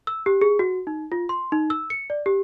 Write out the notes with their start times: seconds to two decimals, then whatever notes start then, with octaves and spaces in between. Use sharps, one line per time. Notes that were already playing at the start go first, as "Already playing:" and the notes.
0.07 E6
0.26 G4
0.41 G#4
0.59 F#4
0.87 D#4
1.12 F4
1.29 C6
1.52 D#4
1.70 E6
1.90 C#7
2.10 D5
2.26 G4